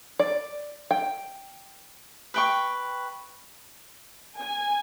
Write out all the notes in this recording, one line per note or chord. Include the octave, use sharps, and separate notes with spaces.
D5
G5
B4 G5 C#6
G#5